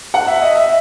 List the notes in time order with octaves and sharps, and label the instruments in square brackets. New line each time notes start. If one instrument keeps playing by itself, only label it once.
[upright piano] F#5
E5
D#5
E5